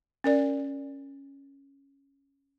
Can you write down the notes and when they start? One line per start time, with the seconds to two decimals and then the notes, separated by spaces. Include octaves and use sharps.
0.24 C#4 A#4 D5